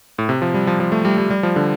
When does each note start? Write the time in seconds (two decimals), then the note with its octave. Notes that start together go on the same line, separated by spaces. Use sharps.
0.19 A2
0.29 C3
0.42 F3
0.54 G3
0.67 F3
0.80 F3
0.92 A3
1.05 G3
1.18 G3
1.30 G3
1.43 F3
1.56 D3